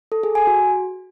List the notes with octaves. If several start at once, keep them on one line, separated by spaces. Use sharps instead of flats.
A4
G#4
G#5
F#4